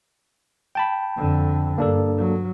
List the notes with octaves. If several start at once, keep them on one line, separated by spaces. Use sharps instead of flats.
G5 A5 B5
F2 D3
G2 A#3 D4 A4
F#3